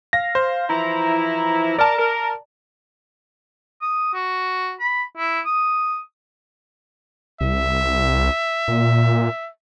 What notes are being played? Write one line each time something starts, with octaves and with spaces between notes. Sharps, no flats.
F5 A#6
C5
E3 F3 E4 A#5
A#4 D5 A5
A#4
D#6
F#4
B5
E4
D#6
C2 E5
A#2